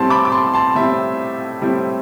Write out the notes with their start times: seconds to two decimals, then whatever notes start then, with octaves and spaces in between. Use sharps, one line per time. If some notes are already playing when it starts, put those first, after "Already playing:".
Already playing: A2 G3 C4 E4 A5 C6
0.10 B5 D6
0.25 D6
0.32 A5 C6
0.53 A5 C6
0.75 A2 G3 C4 E4 E5
1.62 A2 G3 C4 E4